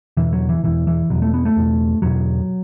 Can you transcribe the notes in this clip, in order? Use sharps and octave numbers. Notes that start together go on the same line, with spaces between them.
E2 B2 E3
F#3
E3
E2 B2 E3
E3
E2 B2 F#3
A3
B3
A3
E2 B2
E2 B2 F#3